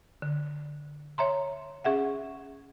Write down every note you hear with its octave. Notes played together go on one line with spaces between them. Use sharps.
D3
C#5 E5 A#5 C6
C#4 G#4 E5 F#5